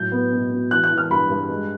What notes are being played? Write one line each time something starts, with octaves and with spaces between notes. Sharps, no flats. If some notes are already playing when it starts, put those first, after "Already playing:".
Already playing: A2 F#3 G6
B3
B2
B2
E3 F#6
F#6
E3
F6
G2 B5
G2
G#3